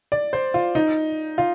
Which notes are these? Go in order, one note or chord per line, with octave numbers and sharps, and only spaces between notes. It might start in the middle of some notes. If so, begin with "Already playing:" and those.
D5
C5
F4
D#4
F4